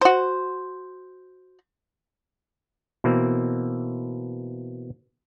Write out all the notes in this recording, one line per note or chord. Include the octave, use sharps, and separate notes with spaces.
F#4 C5
B2 E3 A#3 C4